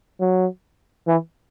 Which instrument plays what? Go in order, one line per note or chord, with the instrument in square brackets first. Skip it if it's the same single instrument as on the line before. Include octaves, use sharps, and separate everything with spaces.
[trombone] F#3
E3